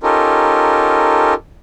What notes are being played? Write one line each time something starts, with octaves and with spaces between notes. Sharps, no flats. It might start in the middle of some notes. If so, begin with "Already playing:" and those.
C#4 D#4 F4 G4 A4 A#4